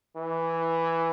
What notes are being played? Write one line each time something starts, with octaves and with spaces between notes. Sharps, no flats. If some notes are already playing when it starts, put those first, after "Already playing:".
E3